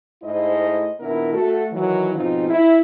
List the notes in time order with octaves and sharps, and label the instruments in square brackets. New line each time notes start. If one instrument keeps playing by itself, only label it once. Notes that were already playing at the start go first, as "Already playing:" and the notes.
[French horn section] G#2 A3 E4 C5 D#5
A#2 D#3 B3 D4 E4 A#4
A3 F#4 A4
D#3 E3 F#3
G#2 B2 F3 C4 D#4 F4
E4